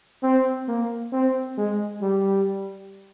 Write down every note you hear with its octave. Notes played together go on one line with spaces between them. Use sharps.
C4
A#3
C4
G#3
G3